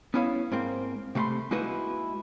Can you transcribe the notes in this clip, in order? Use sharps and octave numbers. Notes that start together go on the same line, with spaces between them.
B3 C#4 E4 C#5 F5
G#2 A#3 C4
C3 A3 F5 B5 C6
G#3 A#3 D#4 E4 F#4 B4